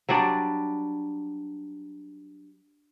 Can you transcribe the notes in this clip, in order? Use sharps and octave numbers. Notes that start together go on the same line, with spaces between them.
F#3 G3 D4 D5